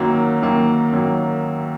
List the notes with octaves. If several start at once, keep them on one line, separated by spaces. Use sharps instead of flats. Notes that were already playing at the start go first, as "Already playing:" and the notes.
Already playing: F#2 D#3 F#3 A#3
F#2 D#3 F#3 A#3
F#2 D#3 F#3 A#3